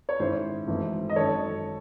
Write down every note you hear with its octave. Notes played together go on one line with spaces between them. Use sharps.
C#5
G#2 D#3 G#3 C#4 E4 C5
G#1 G#2 E3 A3 C4
D#5
G#1 F#2 D#3 A4 C#5